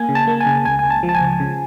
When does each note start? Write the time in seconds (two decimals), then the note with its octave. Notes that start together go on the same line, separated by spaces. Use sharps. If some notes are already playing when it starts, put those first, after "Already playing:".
Already playing: A#3 G#5
0.09 C#3
0.15 A5
0.27 A#3
0.40 G#5
0.46 C#3
0.65 C#2 G#5
0.79 C#2 G#5
0.90 A5
1.03 F3
1.09 A5
1.15 G#5
1.21 C#2
1.40 C#3